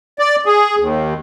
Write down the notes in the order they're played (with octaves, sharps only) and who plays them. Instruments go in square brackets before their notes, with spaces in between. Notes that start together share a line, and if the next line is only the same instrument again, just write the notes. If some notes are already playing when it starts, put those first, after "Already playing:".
[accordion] D5
G#4
D#2